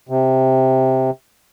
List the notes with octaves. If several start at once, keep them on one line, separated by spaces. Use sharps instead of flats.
C3